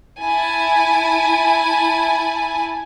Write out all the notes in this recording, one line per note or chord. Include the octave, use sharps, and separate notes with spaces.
E4 G#5 A5